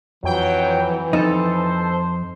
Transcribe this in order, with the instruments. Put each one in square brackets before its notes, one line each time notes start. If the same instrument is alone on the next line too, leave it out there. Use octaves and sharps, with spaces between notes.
[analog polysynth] F2 G5 [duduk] E3 [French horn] F#3
[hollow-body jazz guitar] F2 D#4 [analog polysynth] A4 [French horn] C5